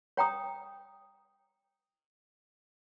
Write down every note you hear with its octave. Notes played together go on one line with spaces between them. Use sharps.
C#5 G5 A#5 D#6